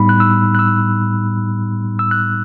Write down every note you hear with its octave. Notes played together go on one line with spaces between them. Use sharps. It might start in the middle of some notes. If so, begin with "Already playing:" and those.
Already playing: A2 G3 B3 D#4 B5
F#6
E6
F#6
E6
E6
F#6